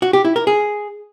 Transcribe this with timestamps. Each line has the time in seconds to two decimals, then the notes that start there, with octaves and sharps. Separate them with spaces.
0.02 F#4
0.13 G4
0.25 E4
0.36 A#4
0.47 G#4